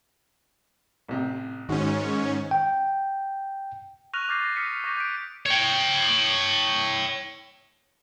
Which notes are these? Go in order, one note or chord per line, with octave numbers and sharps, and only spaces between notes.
A1 C3
G#2 D#3 C#4 D#4 F#4 C5
G5
C#6 F6 F#6 A#6 D#7 F7
D6 F#6 G6 A6 A#6 C7
A#6
D#6 F6 A#6 B6 C#7 D#7
C#6 D6 G6 A#6 B6 D#7
G6 B6 D7
C#5 G5